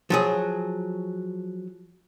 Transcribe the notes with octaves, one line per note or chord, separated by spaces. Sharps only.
F3 F#3 G#4